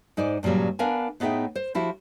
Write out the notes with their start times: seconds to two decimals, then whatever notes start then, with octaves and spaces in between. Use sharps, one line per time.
0.17 G#2 D#4 C5 D5 G#5
0.43 G2 A#2 C#3 F#3 G3
0.79 B3 D4 A#4 F5 G#5
1.20 A2 B3 D#4 G#4 E5 G5
1.55 C5
1.75 F3 E4 F#4 G4 E5